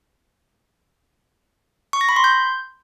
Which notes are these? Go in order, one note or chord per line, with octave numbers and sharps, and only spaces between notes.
C#6
A#6
B5
C6
G6